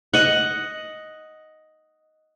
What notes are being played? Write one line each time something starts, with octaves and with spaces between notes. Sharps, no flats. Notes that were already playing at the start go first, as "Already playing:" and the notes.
D#5 F#5